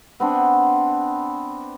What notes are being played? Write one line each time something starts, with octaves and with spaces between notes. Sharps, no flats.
B3 C4 D4